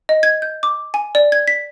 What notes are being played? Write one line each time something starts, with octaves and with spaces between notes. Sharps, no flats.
D#5
G#6
G6
D6
G#5
D5
G#6
B6